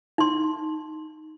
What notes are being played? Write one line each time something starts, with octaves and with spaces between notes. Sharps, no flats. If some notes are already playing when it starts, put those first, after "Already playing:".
D#4 C6